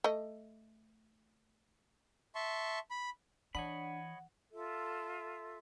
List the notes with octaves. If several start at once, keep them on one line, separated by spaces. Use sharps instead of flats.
A3 D#5
E5 A5 C6 C#6
B5
E3 D4 C#5 D#5 F#5 B5
F4 A4 E5